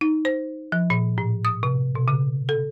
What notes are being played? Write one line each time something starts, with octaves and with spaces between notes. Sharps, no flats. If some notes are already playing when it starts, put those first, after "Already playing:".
D#4
C5
F3
A#2
A2
D#6
C3
B2
C#3
A4